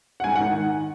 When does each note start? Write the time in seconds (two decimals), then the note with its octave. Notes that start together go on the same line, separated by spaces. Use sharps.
0.20 F#5
0.24 G#2 G#5
0.36 F#5
0.40 D#3